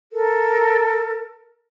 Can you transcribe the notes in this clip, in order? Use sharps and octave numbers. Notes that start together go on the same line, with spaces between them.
A4 A#4